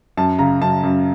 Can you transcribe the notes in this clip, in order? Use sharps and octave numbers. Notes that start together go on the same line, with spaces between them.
F#2 A5
C#3 A#5
F#2 A5
F#2